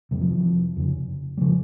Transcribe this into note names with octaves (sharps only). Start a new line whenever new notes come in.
F2 C3 G3
F3
E3
F3
F2 C#3
G3
C#3 F3